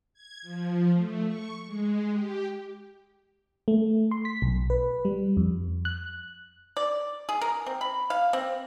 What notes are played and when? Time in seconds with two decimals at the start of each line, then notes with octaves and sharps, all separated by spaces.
0.14 G#6
0.42 F3
0.93 A3
1.26 C#6
1.66 G#3
2.11 G4
3.68 A3
4.11 C6
4.25 B6
4.42 B1
4.70 B4
5.05 G3
5.37 F2
5.85 F#6
6.77 D5
7.29 G#4
7.41 A#4
7.66 C4
7.81 B5
8.10 F5
8.33 C4